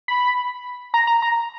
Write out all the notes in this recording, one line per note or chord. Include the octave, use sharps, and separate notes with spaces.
B5
A#5
A#5
A#5